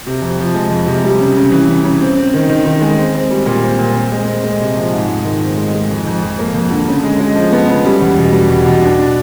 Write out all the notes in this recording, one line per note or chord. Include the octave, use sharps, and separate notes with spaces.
C3
F2
F3
G#3
F2
C3
G3
C#3
C#3
E3
C#3
C#3
C4
C4
D#3
D#3
D#3
G#3
C4
C4
G3
A#2
C4
A#2
C4
G#3
C4
G#3
C3
F3
G#2
G#3
D#3
C4
G#3
G#3
F2
F2
F2
A#3
F2
D3
C#3
G#3
G#3
F3
B3
C#3
G3
E2
B2
G3
E2
B2
D4
D4